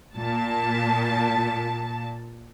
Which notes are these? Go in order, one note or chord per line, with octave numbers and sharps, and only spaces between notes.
A#2 A5